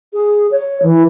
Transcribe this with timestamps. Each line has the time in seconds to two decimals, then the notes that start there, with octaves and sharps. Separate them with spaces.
0.13 G#4
0.51 C#5
0.82 E3